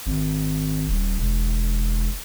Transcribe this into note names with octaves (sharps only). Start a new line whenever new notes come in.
G#1
D#1
E1